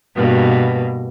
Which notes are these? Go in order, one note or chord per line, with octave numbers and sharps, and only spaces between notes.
G2 B2 A#3